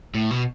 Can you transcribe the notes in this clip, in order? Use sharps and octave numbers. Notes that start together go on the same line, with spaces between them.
A2
B2